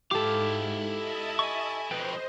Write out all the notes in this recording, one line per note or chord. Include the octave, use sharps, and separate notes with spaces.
G#2 E4 G4 A4 F5 D6
D#5 E5 A5
G#5 C#6
F2 B2 B4 C5 D#5 G5